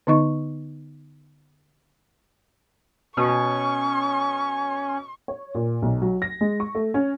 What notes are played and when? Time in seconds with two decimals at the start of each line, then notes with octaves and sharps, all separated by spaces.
0.07 D3 B3 D#4 D#5 C#6
3.17 B2 C#4 C#6
5.28 C#5
5.55 A#2
5.82 B1
6.02 F#3
6.22 A#6
6.41 G#3
6.60 C#6
6.75 A3
6.94 C#4